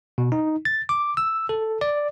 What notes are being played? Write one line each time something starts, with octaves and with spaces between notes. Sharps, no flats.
B2
D#4
A6
D6
E6
A4
D5